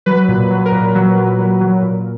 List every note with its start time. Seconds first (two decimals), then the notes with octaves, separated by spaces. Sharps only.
0.06 F#3 B4
0.29 A#2
0.51 F#3
0.66 A#4
0.72 A#2
0.95 F#3
1.17 F#3
1.39 F#3
1.61 F#3
1.82 A#2